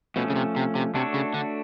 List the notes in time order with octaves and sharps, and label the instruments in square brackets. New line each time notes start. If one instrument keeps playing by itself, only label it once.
[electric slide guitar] B2 [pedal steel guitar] F3 A3 C#4
[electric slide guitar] C#3
C3
C3
C3
[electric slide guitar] C3 [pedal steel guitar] A3 D4 F#4 A4 C#5
[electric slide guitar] C#3
D3